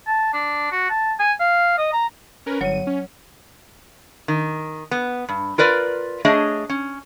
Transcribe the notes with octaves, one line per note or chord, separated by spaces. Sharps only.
A5
D4
F#4
A5
G#5
F5
D#5
A#5
C#4 A#4 B4
G1 F#3 C#5 D#7
C#4
D#3
B3
G2
F4 A#4 B4 D5
A3 D4 G#4 C#5 D#5
C#4